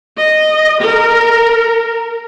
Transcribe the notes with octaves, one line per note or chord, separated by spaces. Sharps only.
D#5
A#4